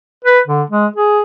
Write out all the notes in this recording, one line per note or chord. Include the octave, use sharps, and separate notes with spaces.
B4
D3
G#3
G#4